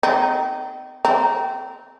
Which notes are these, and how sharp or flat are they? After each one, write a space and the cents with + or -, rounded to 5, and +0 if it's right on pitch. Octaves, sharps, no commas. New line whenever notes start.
C4 -35 D#4 -15
C4 -25 A#5 +0